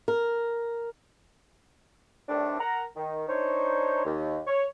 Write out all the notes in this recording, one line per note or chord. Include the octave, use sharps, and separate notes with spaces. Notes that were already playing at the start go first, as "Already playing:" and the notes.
A#4
A2 D#3 G3 A3 C4 D4
A#4 F#5 A#5
D#3
D4 D#4 C5 C#5
D#2
C#5